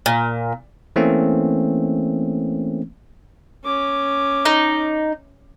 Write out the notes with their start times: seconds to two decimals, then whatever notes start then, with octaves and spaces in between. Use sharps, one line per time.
0.06 A#2
0.96 E3 A3 A#3 C4 C#4
3.65 C#4 D6
4.45 D#4